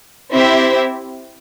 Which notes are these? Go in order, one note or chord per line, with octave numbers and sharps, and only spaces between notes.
C4 E4 G4 C5 E5